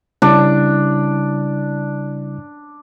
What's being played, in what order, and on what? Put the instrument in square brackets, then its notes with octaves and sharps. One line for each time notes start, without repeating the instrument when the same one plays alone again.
[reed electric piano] C#3 G3 E4 [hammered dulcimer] D4